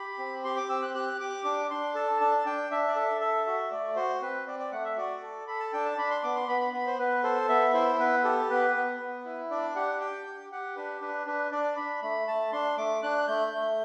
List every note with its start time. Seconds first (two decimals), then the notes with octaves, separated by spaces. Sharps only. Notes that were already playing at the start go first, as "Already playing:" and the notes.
Already playing: G4 B5
0.18 C4
0.44 G4 C6
0.56 D6
0.69 C4 E6
0.82 F#6
0.94 G4 F#6
1.20 G4 D6
1.44 D4 D6
1.70 D4 C6
1.95 A4 A5
2.21 D4 A5
2.46 D4 G5
2.71 D4 E5
2.87 D5
2.95 A4 E5
3.21 A4 E5
3.46 F#4 E5
3.71 A3 D5
3.96 F#4 C5
4.21 C4 B4
4.47 C4 D5
4.59 D5
4.72 A3 F#5
4.85 E5
4.97 F#4 D5
5.22 A4
5.48 A4 B5
5.60 A5
5.73 D4 G5
5.85 A5
5.98 D4 B5
6.11 C6
6.23 B3 D6
6.36 C6
6.48 B3 B5
6.61 B5
6.73 B3 B5
6.86 C5
6.99 B3 B4
7.24 A4 C5
7.49 B3 E5
7.74 E4 C5
7.99 B3 B4
8.24 G4 A4
8.50 B3 B4
8.75 B3
9.00 B3
9.25 E4
9.51 D4 D5
9.76 G4 F#5
10.00 G4 G5
10.27 G4
10.52 G4 F#5
10.76 D4 B4
11.01 D4 B4
11.26 D4 B4
11.51 D4 D5
11.77 D4 B5
12.02 A3 B5
12.27 A3 A5
12.52 D4 C6
12.77 A3 D6
13.03 D4 F#6
13.28 A3 G6
13.53 A3